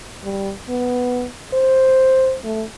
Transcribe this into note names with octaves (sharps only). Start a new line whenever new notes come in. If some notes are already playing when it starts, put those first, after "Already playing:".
G3
B3
C5
A3